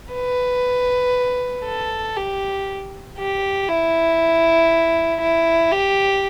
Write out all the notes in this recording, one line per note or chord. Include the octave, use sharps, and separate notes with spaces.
B4
A4
G4
G4
E4
E4
G4